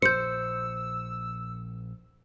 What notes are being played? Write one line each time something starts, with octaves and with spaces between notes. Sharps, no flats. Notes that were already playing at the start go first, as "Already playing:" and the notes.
A#1 C5 E6 G6 C#7